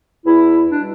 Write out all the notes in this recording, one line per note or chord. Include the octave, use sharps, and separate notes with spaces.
E2 E4
B2 G3 D4